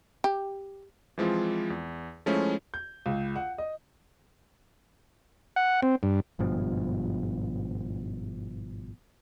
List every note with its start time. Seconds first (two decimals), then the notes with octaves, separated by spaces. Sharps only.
0.24 G4
1.18 E3 F3 G#3 C4 F4
1.70 E2
2.26 F3 G#3 A3 C#4 E4
2.74 G6
3.06 C#2
3.36 F#5
3.58 D#5
5.56 F#5
5.82 C4
6.03 G2
6.39 G#1 G2 B2 F3